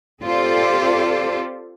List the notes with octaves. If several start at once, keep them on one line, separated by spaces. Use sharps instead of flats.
C4 F4 G4 A4 C5 D5